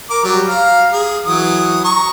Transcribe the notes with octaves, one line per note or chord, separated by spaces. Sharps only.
A#4 D6
F#3 G3
F5 A#5
G#4
E3 F#3 D#6
A#5 C#6